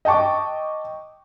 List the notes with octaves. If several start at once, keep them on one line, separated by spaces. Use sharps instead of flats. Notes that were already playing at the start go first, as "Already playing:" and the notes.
D#5 G5 A5 C#6 D6